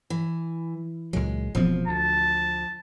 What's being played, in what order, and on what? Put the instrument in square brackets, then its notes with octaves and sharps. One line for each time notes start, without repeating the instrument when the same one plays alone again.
[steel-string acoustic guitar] E3
[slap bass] C#2 A#2 F#3 [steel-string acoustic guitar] G#3
[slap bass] E1 B2 C4 [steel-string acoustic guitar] F3
[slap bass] D2 [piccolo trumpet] A5